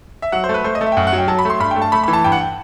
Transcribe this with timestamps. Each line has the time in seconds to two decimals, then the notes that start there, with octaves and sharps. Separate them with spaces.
0.22 E5
0.32 F#3 F#5
0.44 C5
0.49 A3 B4
0.64 A3 C5
0.75 D#5
0.81 A3
0.86 E5
0.92 G5
0.97 F#2 F#5
1.07 F#5
1.13 F#3
1.18 G5
1.28 F#3 A5
1.39 B5
1.45 A3 C6
1.60 G2 B5
1.71 G5
1.76 A3
1.82 A5
1.92 A3 B5
2.03 B5
2.08 E3
2.13 A5
2.24 G2 G5
2.32 F#5
2.41 G5